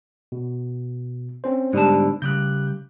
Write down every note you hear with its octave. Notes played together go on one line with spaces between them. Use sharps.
B2
C4 C#4 C5
G#2 D3 G3 B3 A5
C#3 G3 F#6 G6